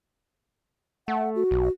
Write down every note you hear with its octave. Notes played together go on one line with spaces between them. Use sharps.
A3 F#5
F#4
B1